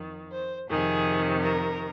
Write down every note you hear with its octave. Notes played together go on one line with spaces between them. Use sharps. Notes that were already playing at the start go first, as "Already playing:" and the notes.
Already playing: F2 D#3
C5
F2 C3 D#3 G#4
A#4